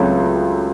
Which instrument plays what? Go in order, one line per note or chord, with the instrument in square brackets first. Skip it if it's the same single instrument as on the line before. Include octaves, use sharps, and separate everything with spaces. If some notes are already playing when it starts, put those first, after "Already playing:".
Already playing: [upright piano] C#2 C#3 F#3 A3 C4